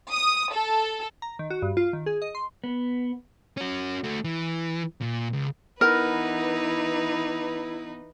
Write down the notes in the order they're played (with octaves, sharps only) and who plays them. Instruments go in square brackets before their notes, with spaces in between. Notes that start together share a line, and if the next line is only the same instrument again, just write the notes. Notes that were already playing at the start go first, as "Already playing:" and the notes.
[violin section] D#6
A4
[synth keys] A#5
D#3
F#4
G2
F4
D#3
G#4
D#5
C6
[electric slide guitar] B3
[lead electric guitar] C#4 F#4
A3 F#4
E3
A#2
C#2
[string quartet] E3 D#4 B4 [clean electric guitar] B3 [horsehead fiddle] E4 [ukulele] A#4